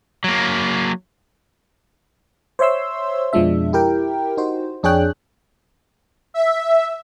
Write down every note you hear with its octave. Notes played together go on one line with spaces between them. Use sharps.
F#3 A#3
C5 C#5 E5 C6 E6
F2 B2 F3 G#3 D4 E5
E4 G4 A#4 G5
D#4 F#4 C5
F2 D4 G#4 C#5 G5 F#6
E5